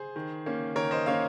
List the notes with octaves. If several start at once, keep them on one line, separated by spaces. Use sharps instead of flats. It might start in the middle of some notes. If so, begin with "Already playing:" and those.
Already playing: G#4 C5
D#3
A#3 C#4
D#3 A#4 C#5
C5 D#5
A#3 C#4 C#5 F5